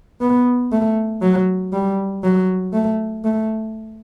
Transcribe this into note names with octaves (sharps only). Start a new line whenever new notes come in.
B3
A3
F#3
G3
F#3
A3
A3